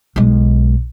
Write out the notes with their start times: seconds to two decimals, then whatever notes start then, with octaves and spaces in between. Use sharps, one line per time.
0.16 B1 G#3